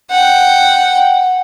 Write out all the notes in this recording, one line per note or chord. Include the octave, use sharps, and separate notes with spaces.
F#5 G5